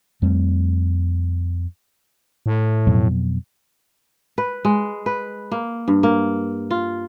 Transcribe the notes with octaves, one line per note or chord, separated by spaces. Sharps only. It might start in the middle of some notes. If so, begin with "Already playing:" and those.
F2 G3 A3 C4
A2
F2 B2 F#3
B4
G#3
B4
A#3
G2
A#3
F4